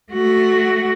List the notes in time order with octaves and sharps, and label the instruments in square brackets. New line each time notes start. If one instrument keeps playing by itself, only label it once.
[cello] A3 F#4